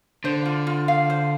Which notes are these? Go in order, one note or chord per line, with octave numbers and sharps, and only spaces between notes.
D3 C5
F4
F4
F5
C5